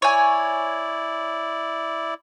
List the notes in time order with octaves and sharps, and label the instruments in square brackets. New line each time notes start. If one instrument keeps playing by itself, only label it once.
[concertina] E4 D5 [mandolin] C#5 G#5